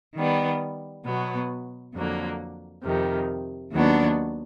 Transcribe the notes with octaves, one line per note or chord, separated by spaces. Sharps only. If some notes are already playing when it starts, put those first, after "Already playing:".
D#3 G3 B3
B2 F#3 B3
F2 D3 F#3 A#3
F2 C3 D#3
D#2 D#3 F#3 B3 D4